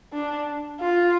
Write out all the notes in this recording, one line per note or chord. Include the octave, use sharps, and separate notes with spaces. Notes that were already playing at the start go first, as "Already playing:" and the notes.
D4
F4